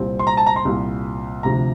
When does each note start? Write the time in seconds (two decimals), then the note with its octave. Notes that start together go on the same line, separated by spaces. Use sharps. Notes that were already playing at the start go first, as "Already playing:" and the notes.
Already playing: C2 A#2 G3 C4
0.19 C6
0.27 A#5
0.37 A5
0.46 A#5
0.56 C6
0.65 C2 A#2 G3
1.43 D2 C3 F3 A#5